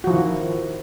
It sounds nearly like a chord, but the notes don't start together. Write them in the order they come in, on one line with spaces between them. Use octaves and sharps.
F#4 F3 E4 D#3